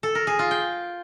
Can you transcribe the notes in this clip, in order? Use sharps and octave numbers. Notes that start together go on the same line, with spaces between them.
A4
A#4
G#4
F4
G5